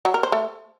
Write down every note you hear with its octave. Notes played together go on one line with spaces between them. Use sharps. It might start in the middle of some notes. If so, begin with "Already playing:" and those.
F#3
A#4
C5
A3